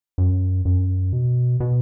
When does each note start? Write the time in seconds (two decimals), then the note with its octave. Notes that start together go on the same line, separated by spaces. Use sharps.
0.18 F#2
0.65 F#2
1.13 B2
1.60 B2